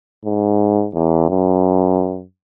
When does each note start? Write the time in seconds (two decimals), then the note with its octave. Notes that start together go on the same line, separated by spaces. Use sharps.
0.25 G#2
0.94 E2
1.30 F#2